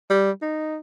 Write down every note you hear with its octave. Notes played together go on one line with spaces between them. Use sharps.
G3
D#4